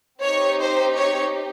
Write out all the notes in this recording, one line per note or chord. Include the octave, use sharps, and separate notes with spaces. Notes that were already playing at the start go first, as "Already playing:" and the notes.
C4 D#4 G4 C#5
C5
C#5